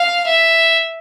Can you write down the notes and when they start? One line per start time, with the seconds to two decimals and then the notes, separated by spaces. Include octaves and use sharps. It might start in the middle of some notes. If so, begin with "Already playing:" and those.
Already playing: F5
0.27 E5